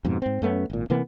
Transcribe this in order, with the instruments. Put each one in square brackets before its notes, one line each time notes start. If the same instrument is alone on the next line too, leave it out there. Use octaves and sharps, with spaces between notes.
[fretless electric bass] F2 G#2 B2
G#2 C4
F#2 A3 B3 C#4
G#1 A#2
C3 E3 A#3 B3